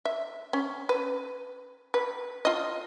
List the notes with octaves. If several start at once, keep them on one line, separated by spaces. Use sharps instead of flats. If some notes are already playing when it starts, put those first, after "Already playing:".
E5
C#4
B4
B4
F4 D#5